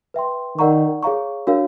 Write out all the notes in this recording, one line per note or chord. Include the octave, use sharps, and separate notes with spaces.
B4 E5 G5 C6
D#3 A#4 D5 F#5 A#5 C#6
G#4 C#5 F5 A#5 C#6
D4 F#4 A#4 C#5 F5